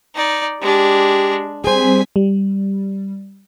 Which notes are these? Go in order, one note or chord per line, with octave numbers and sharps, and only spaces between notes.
D#4 D5
G#3 D4 G4
G3 C4 G#4 C5 G#5 B6
G3